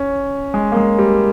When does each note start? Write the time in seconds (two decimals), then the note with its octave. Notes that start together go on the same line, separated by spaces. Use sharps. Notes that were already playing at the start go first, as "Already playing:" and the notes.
Already playing: C#4
0.54 G#3
0.72 A#3
0.77 G#3
0.98 G3